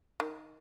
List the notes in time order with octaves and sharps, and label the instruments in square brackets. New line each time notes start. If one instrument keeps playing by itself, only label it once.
[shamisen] D#3